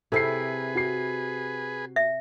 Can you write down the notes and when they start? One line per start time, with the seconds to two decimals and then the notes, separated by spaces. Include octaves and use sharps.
0.12 C3 E4 G#4 A4 B4 C7
0.75 F#4 C7
1.96 E5